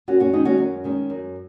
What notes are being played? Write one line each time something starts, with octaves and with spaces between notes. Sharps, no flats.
F#2 C#4 F#4
C#4 F#4
D#3 G#3 C#4 D#4
C#4 F#4
F#2 C#4
D#3 G#3 C#4
F#2